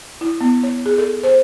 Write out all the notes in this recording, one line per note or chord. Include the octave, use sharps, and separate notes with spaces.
E4
B3
C#5
G#4
A4
C5